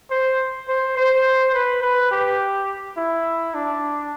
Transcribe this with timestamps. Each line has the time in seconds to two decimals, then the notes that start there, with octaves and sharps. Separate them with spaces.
0.10 C5
0.68 C5
0.97 C5
1.54 B4
1.82 B4
2.11 G4
2.97 E4
3.54 D4